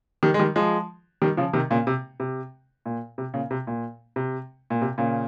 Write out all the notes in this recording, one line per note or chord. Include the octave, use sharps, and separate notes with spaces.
D#3 G3
G#3
D#3 G3
F3 G#3
D#3 G3
C#3 F3
C3 D#3
A#2 C#3
C3
C3
A#2
C3
A#2 C#3
C3
A#2
C3
A#2
C3
A#2 C#3